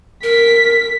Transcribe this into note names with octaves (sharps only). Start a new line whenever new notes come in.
A#4 B6